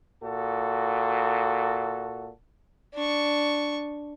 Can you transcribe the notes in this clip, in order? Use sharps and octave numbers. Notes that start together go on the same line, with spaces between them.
A#2 F#4 A4
D4 C#6